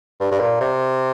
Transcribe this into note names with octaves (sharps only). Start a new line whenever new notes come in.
G2
G2
A#2
C3